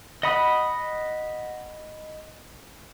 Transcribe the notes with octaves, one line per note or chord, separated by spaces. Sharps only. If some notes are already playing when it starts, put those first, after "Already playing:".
D#5 F#5 B5 D#6